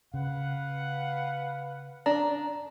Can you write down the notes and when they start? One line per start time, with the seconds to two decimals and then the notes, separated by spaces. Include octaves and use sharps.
0.14 C#3 B4 F5 F#5
2.06 D4 A#5